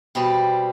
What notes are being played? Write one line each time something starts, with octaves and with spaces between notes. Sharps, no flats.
B2 G3 C4 G4